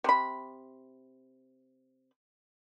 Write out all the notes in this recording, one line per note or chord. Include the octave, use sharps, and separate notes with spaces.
C3 B5